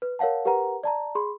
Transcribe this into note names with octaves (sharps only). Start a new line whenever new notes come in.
B4
A#4 C#5 F5 F#5 A5
G4 A#4 B4 F#5 A#5
D5 A5 A#5
G#4 B5 C6